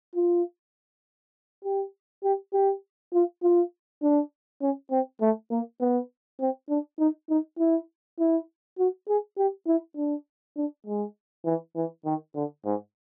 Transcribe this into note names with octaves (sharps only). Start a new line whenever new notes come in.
F4
G4
G4
G4
F4
F4
D4
C#4
C4
A3
A#3
B3
C4
D4
D#4
D#4
E4
E4
F#4
G#4
G4
E4
D4
D4
G#3
E3
E3
D#3
D3
G#2